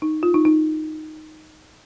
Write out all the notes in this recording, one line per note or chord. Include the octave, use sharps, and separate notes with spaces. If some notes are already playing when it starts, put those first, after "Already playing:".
D#4
F4
D#4
D#4